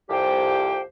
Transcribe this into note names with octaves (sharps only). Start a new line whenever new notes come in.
C2 F2 G4 C5 G5